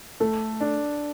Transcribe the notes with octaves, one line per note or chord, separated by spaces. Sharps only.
A3 A4
D4